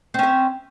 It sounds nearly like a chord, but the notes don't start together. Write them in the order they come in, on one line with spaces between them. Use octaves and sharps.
C4 C#4 E5